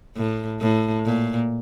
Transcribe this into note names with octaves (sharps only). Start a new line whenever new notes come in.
A2
A2
A#2